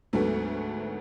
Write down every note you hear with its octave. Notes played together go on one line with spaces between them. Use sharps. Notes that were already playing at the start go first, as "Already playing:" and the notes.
D2 G#2 F#3 A3 B3